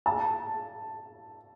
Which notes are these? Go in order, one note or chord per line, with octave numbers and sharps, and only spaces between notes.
A5